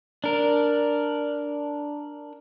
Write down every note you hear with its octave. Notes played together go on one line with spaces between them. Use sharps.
D4 A#4